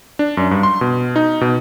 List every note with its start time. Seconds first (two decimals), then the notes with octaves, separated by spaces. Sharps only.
0.19 D4
0.37 F#2
0.51 G2
0.63 C6
0.81 B2
1.16 D#4
1.41 B2